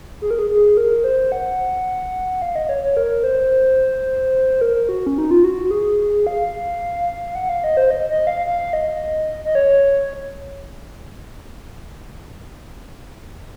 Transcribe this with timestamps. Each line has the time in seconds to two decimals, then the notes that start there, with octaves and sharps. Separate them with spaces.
0.22 G#4
0.31 A#4
0.38 G#4
0.50 G#4
0.77 A#4
1.04 C5
1.32 F#5
2.42 F5
2.56 D#5
2.69 C#5
2.83 C#5
2.97 A#4
3.24 C5
4.61 A#4
4.89 F#4
5.07 C#4
5.18 D#4
5.31 F4
5.44 F#4
5.71 G#4
6.27 F5
7.35 F#5
7.49 F5
7.64 D#5
7.77 C5
7.91 D#5
8.10 D#5
8.27 F5
8.46 F5
8.73 D#5
9.45 D#5
9.55 C#5